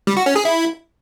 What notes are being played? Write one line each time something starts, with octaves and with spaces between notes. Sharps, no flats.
G3
F#4
C#4
G#4
E4